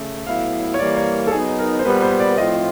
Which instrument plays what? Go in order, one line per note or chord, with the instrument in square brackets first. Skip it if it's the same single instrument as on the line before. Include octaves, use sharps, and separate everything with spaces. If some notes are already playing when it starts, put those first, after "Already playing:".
Already playing: [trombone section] C#3 A3
[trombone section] A2 F#3 B3 E4 [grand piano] F5
[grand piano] C#5
[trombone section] E3 G3 A#3 [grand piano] D5
[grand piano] C#5
A4
[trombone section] F#3 B3 D#4 [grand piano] G#4
[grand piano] A#4
C5
[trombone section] A#2 G3 B3 [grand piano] B4
[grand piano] C5
D5
[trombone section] A2 F3 A3 C4 F4 [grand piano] D#5